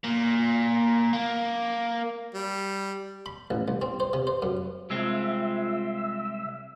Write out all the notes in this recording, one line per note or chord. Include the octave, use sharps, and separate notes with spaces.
A#2
A#3
G3
B5
A1
C2
C4
C5
C3
C5
F#2
C2 G#3 C4 F4 E5